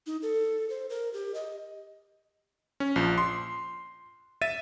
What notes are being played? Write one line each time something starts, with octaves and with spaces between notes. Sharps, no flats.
D#4
A4
C5
A#4
G4
D#5
C#4
A#1 F3
C6
E5 A6 D#7